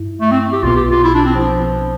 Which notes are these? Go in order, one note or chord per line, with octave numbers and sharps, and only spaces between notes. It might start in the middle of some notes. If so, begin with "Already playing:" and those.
Already playing: G2 E4
A3
C4
G4
B1 B2 B3 F4
G4
F4
E4
D4
C4
F3